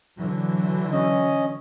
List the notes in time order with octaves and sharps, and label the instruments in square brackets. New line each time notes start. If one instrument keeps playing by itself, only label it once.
[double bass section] D3 E3 F#3
[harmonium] C#4 D#5